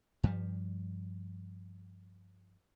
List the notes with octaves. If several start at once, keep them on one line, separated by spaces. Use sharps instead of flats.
G2 F3 G3